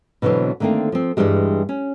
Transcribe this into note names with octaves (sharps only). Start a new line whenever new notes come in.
B2 D3 E3 F#3 C4
D3 D#3 A3 A#3 C4
F3 C4
G2 A#2 E3 G3 G#3
C#4